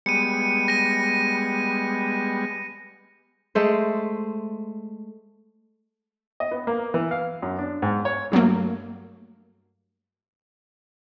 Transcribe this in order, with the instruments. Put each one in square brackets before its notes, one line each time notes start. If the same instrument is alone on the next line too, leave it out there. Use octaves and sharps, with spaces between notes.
[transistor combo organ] G3 G#3 B3 [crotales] C#7 D#7
[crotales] A#6 D#7
[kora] G#3 A3 C5
[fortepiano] D#5
B3
A#3
E3
F5
F#2
D4
G#2
C#5
[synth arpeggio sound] G2 F#3 A3 A#3